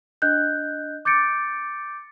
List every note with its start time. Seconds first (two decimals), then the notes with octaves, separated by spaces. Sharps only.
0.22 D4 D#5 F#6 G6
1.05 D6 G6 A6 C#7 D7